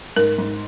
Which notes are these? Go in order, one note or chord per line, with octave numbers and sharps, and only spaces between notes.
G#2 A#4
G#2